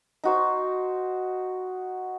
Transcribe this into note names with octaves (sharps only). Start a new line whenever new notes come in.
D#4 F#4 C5